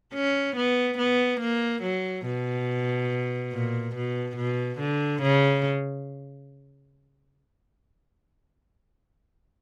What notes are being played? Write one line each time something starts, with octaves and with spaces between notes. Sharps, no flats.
C#4
B3
B3
A#3
F#3
B2
A#2
B2
B2
D3
C#3